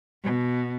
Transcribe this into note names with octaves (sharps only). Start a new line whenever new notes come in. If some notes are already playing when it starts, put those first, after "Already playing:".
B2